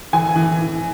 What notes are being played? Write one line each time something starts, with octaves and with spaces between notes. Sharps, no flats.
E3 G#5
E3